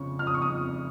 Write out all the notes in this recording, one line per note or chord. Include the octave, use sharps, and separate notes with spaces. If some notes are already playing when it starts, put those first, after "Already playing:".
Already playing: F2 C#3 F3 C#6
F2 F6
D#6
C#6
D#6
F2